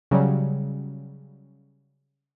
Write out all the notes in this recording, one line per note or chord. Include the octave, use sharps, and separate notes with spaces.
C#3 F#3 G3